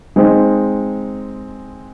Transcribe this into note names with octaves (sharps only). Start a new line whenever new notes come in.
G#3 C4 D#4